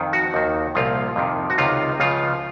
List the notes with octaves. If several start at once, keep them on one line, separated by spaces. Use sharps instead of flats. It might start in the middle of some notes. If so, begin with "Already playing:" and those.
Already playing: F2 D#3
F#4
D#2 D#3
C2 A#2 F3 F4
F2 C3 D#3
F#4
C#2 C3 D#3 F4
C#2 C#3 F3 F4